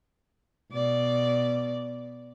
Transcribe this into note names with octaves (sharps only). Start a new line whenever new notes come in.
B2 D5